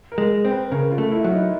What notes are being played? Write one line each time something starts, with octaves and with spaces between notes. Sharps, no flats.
A#4
G#3
C4
B4
C#3 A#4
F4
A3
E4
F#3 E4
D#4